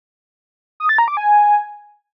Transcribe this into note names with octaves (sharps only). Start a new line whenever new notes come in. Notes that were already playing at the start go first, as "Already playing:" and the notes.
D#6
A6
A#5
D6
G#5